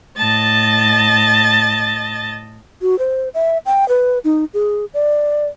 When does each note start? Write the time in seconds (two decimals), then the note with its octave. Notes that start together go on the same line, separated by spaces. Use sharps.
0.16 A2 D#5 A5 A6
2.82 F#4
2.99 C5
3.34 E5
3.66 G5
3.89 B4
4.24 D#4
4.54 G#4
4.94 D5